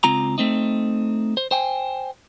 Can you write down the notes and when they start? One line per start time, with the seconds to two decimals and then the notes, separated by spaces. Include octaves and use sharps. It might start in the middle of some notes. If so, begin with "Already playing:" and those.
0.04 C#2 C4 F4 A#5
0.38 A3 C4 D#4
1.37 C5
1.51 C5 G5 G#5